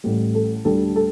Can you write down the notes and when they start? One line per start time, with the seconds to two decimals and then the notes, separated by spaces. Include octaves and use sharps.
0.04 A1 A2 G3
0.35 A4
0.65 D2 D3 G3 A4
0.96 A4